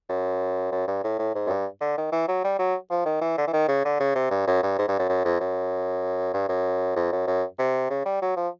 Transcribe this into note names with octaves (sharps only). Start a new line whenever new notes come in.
F#2
F#2
G2
A2
A2
G#2
F#2
G2
D3
D#3
E3
F#3
G3
F#3
F3
D#3
E3
D3
E3
D#3
C#3
D3
C#3
C3
G2
F#2
G2
G#2
G2
F#2
F#2
F2
F#2
G2
F#2
F2
F#2
F#2
C3
C#3
G3
F#3
F3